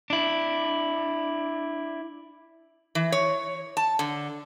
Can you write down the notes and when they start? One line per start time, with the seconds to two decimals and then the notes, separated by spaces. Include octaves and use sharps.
0.10 D4 E4
2.95 E3
3.12 C#5
3.77 A5
3.99 D3